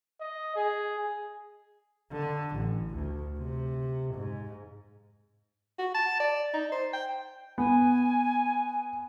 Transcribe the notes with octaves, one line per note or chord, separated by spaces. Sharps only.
D#5
G#4
D3
A1
D2
C3
G#2
F#4
A5
D5
D#4
C5
G5
B3 G#5